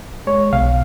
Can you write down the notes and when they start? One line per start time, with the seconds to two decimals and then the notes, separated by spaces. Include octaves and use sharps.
0.27 G#3 C#5
0.53 B1 F5